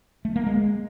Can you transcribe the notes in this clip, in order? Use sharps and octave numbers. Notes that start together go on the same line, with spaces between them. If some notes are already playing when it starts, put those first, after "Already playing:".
A3
A#3
G#3